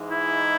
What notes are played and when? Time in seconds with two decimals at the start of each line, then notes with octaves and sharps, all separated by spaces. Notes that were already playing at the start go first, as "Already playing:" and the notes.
Already playing: G#2 E3 G#3 D#4
0.11 E4